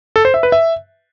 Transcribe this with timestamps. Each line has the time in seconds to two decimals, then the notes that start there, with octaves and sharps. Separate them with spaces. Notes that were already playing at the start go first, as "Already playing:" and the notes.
0.16 A4
0.25 C5
0.34 E5
0.43 B4
0.52 E5